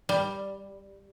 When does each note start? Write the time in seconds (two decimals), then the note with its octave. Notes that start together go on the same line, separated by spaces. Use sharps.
0.09 G3